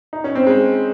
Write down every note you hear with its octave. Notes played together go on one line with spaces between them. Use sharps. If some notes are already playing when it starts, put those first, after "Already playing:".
D#4
C#4
C4
G#3